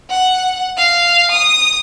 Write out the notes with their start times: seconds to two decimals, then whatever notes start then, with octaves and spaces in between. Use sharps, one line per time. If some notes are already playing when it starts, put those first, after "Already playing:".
0.10 F#5
0.77 F5
1.31 D#6